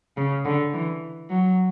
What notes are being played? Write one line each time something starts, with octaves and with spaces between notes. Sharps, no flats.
C#3
D3
E3
F#3